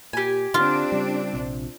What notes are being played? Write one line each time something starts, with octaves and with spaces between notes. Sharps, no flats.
A#2 G4 G#5
D3 C4 D4 F4
C#3 G3
A#1 C3